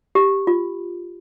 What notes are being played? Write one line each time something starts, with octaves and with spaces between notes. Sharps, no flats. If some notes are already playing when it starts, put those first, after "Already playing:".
G4
F4